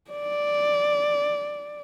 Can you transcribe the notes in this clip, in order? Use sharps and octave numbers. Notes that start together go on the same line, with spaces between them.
D5